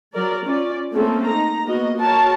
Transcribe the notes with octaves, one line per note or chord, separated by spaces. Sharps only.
F#3 A#4 D5
C#4 F4 D5
A3 A#3 C4 C#4 A4
D#4 A#5
A#3 B3 F#4 D#5
F#4 A#4 C#5 A5